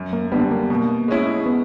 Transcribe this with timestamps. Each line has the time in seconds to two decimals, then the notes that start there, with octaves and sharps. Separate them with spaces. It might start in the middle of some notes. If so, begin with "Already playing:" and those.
Already playing: F#2
0.13 A#3
0.32 D3 G3 B3
0.51 A#3
0.70 B2 A#3
1.08 G#3 C#4 E4
1.46 B3